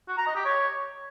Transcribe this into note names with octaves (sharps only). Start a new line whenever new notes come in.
F#4
A#5
D#5
G4
C#5